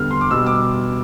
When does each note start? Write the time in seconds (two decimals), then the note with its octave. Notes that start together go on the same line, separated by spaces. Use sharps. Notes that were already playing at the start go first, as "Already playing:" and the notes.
Already playing: E2 D3 G3 F6
0.11 C6
0.21 D6
0.31 B2 G3 E6
0.47 D6